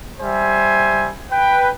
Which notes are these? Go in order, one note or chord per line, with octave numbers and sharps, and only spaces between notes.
G3 C5 E5 G#5
B4 G5